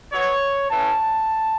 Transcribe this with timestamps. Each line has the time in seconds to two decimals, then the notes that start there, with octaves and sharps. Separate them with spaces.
0.12 B2 F#3 B3 C#5
0.71 A2 E3 C#4 A5